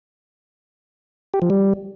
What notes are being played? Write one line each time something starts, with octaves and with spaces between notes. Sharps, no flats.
G4
F3
G3